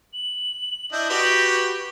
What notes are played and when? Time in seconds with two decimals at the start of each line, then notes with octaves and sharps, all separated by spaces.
0.13 F#7
0.92 D4 E4 D#5 G6
1.10 F#4 G4 B4